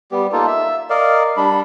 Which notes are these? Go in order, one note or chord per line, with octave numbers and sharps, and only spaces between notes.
G3 B3 G4
A#3 D#4 F4 A4
E5
A#4 D5 D#5 F5
G3 D4 B5